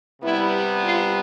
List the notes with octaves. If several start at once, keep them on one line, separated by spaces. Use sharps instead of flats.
C3 G3 B3 E4
F4